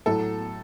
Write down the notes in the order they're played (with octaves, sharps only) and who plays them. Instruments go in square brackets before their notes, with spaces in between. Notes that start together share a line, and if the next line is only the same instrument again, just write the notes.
[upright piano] A2 F#3 A4